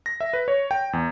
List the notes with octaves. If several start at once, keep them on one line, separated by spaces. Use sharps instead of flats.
A#6
E5
B4
C#5
G5
E2